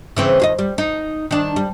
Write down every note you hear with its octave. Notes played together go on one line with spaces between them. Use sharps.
C#3 E3 C4
D#2 F4 D#5
G3
D#4
D#3 D4
G3